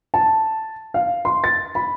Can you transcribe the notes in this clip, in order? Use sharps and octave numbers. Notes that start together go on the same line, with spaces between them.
A5
F5
C6
A6
B5